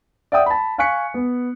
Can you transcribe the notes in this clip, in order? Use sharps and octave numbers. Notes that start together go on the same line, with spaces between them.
D5 E5 F#5 G5 D#6
A5 B5
F5 G#5 C#6 F#6 B6 C#7
B3